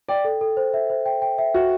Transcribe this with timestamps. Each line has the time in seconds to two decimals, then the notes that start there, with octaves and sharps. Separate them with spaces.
0.08 D5 G5
0.25 A4
0.41 A4
0.57 C5
0.74 E5
0.90 C5
1.06 G5
1.22 G5
1.38 E5
1.54 F#4 E5